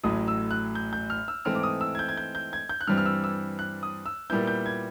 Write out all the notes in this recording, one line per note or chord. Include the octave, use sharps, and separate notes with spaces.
A1 A2 F#3 D#6
E6
F#6
G6
G6
F6
E6
G#2 E3 A3 C4 F6
D6
D#6
E6
G#6
G6
G#6
G6
G6
G#6
G6
F#6
G2 E3 G3 C4 F6
F6
E6
E6
F#6
D#6
E6
A#2 G3 B3 E4 G6
G6
G#6